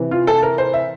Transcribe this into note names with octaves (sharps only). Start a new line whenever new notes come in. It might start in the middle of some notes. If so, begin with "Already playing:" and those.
Already playing: C3 E3
F4
A4
A#4
C5
E5